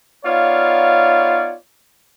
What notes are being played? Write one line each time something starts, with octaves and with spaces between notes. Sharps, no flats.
B3 D#4 F4 C#5 D5 F5